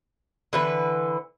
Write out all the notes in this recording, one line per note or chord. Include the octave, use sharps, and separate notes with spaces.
D3 E3 B4